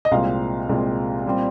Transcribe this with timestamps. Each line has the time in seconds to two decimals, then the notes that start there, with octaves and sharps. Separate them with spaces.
0.05 D#5
0.11 C2 A#2 G#3 C4 F5
0.69 C2 A#2 G#3 C4
1.26 A#2 G3 C4